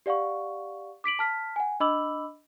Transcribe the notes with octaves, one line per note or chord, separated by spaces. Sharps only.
G4 D5 F5 F#5 C#6
D6 B6 D7 F#7
A5 F6 B6
F#5 G#5
D4 D#5 B5 D6 E6 F#7